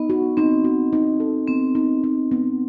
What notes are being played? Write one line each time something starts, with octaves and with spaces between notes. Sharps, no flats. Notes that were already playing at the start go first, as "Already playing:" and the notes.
Already playing: B3 D#4
F#4
C4 D#4
F#4
D#4
A4
B3 C4
D#4
D#4
B3